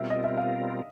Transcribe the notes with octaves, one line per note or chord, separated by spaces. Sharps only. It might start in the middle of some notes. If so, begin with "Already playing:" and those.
Already playing: B2 G3 C4 F4 A#4 E5
D#5
E5
F5